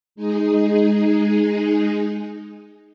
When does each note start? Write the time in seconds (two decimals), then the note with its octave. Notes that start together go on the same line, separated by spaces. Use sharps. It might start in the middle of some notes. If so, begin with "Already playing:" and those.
0.15 G#3 D#4 G#4